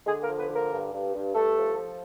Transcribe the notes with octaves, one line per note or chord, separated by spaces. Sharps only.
D3 G#3 G#4
A#3 A#4
F3
B3 B4
D3
A#3 A#4
G2
G2
G2
G2 A3 A4
F3
F3